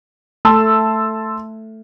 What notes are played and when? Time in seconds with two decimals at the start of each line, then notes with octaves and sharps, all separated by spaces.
0.45 A3 A5 C6 E6